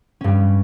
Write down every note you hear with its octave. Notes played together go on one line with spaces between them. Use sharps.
G2 G3 C#4